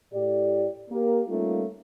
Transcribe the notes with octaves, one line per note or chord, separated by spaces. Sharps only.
A2 G4 D5
A#3 G4 A#4
G3 A3 A#3 C#4 D#4 F4